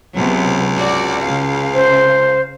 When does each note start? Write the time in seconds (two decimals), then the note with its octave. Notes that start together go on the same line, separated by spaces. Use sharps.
0.16 C#2 C3 F#3 B3
0.77 F#4 D5
1.21 C#3 F5
1.74 C5